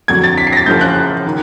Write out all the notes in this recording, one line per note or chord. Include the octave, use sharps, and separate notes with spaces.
F2 D3 F#3 G#6
A6
B6
C7
A#6
A6
F#2 C#3 F3 G6
F#6
D#3